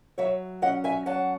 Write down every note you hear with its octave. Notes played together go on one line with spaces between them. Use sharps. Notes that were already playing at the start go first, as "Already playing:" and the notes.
F#3 C#5 E5
C#4 D#5 F#5
E5 G#5
F#3 F#5 A5